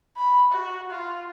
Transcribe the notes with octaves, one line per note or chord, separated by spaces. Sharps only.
B5
F#4
F4